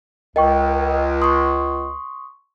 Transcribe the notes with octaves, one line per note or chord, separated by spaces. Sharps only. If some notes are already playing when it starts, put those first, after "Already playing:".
C#2 A#4 D#5 G5 C#6
C6 C#6 D#6